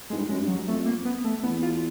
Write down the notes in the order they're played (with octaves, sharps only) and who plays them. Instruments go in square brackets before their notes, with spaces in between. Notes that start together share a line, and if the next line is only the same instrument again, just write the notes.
[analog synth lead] G#3
[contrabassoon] G#2
G2
[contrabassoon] F#2 [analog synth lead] G#3
[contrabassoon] G2
[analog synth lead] F#3
[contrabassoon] F2 [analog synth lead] A3
[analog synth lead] A#3
B3
A3
[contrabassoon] E2 [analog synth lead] B3
[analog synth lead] F4